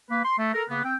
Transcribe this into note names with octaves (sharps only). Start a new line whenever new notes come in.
A#3 B4
C6
A3
A4 A#4
C#3 A#3 B3
C4 G5